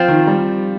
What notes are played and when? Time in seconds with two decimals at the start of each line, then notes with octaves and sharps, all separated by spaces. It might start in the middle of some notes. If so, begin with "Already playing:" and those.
Already playing: F3 C4 F4 C5
0.08 D#3
0.27 G3